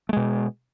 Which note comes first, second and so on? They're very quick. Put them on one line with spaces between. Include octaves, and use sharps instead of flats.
A3 G#3 B2